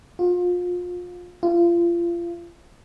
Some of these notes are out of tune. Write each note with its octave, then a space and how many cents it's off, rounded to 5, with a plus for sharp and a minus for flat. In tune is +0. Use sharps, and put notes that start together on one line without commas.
F4 +30
F4 -30